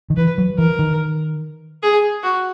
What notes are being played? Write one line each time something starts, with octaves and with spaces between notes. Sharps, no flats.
D#3
E3 B4
F#3
E3 A#4
D#3
G#4
F#4